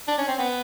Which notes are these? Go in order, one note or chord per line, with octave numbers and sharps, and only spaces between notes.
D4
C#4
C4
B3